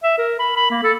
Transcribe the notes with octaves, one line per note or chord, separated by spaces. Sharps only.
E5
A#4
B5
B5
A#3
A4